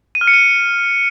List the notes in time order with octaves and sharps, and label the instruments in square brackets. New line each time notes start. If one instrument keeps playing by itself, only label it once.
[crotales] D#7
F6
C#7
D#7